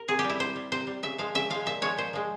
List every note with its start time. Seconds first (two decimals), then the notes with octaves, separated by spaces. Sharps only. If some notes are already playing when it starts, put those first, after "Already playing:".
Already playing: A#4
0.08 C3 G#4
0.19 G4
0.24 G3
0.30 E4
0.39 C3 C5
0.56 G3
0.72 C3 C5
0.87 G3
1.03 C#3 E5
1.18 F3 G#3 F5
1.35 C#3 E5
1.50 F3 G#3 F5
1.66 A#2 E5
1.82 F3 G#3 C#5
1.98 A#2 C5
2.13 F3 G#3